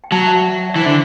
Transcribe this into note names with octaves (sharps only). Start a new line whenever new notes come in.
G5
F#3 F#5 A5
E5 G5
D5 F#5
E5
D5
E3 C5
D3